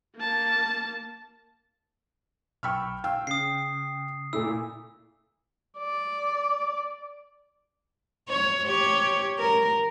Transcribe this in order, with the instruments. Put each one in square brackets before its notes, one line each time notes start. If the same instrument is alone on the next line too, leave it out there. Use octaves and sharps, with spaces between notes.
[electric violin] A#3 A5
[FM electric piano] B1 B5 C#6 [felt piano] G5 E6 F6
[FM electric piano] F5 [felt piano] G5 E6
[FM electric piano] C#3 [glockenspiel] D#6 C7
[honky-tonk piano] A#2 A3 E4 [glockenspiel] E6
[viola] D5
[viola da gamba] C#5
G4 C#5
A#4